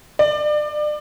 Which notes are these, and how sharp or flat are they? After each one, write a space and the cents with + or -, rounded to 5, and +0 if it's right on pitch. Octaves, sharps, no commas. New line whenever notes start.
D5 +30